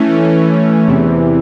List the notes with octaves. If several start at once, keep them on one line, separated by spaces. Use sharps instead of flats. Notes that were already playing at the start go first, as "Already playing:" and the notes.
Already playing: E3 A3 C#4
E2 C3 E3